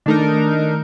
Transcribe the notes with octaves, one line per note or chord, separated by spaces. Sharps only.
D#3 A3 D4 D#4 A#4